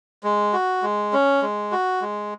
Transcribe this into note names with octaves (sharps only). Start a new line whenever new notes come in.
G#3
F#4
G#3
C#4
G#3
F#4
G#3